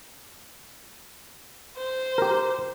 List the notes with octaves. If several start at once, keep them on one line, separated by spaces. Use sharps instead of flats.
C5
G4 A#4